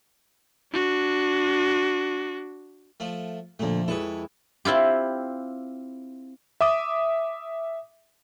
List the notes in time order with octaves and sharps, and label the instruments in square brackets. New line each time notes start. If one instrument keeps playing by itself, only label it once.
[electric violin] D4 F#4
[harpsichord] F3 A3
[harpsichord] F2 A3 [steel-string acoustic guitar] A#2 D3
[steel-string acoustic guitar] F2 G#3 E4 [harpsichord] A4 B4 C#5
[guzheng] C4 E4 F4 G4
[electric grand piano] E5 D6 D#6